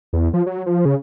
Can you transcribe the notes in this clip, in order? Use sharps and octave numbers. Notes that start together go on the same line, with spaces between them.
E2
F3
F#3
F3
C#3